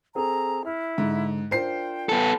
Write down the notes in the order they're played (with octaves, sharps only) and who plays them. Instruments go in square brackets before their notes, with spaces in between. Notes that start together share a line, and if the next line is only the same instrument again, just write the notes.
[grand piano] C4 G#4 A4 [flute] A#5
[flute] E4 [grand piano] F6
[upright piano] G#2 [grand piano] D3
[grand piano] D4 F4 A#4 [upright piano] C5 C7 [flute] G5
[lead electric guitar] B3 A4